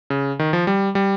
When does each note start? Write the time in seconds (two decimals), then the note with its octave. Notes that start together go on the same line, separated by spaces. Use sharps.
0.10 C#3
0.39 D#3
0.53 F3
0.67 G3
0.95 G3